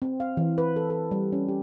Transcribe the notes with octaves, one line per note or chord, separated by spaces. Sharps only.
C4
F5
E3
B4
A4
A4
G3
C#4
G4